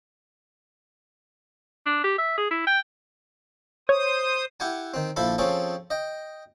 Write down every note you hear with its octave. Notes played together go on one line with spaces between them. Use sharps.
D4
G4
E5
G#4
E4
G5
C5 C#5 D#6
E4 G4 F#5 G#5
D#3 C4
A#1 F3 E4 A4 B5
F3 C4 C#4 G#4 A4
D#5 G5